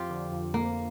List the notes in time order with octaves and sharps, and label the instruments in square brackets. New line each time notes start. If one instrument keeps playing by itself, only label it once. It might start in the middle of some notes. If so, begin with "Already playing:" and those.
Already playing: [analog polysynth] F2 F3 [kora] F4 G4
[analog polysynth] D3
F2
[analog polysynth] F2 [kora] A#3